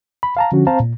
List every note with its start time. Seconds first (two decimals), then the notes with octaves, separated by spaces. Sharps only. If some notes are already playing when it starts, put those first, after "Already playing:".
0.23 B5
0.37 F5 A5 A#5
0.52 D3 F3 C#4 F#4
0.67 C4 C5 F5 A5 A#5
0.80 A#2